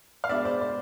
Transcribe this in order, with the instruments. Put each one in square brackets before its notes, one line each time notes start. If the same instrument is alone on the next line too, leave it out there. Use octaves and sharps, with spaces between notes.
[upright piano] F5
B2 G#3 B3 D4 D5 E5
C5 D5
C5 D5